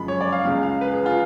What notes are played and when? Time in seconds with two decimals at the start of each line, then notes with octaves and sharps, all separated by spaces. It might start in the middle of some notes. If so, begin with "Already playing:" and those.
Already playing: F#2 C#3 F3 G#3 B5
0.08 C#5
0.21 D5
0.32 F5
0.45 C#2 C#3 G#3 F5
0.63 F5
0.81 B4
0.93 G#4
1.06 F4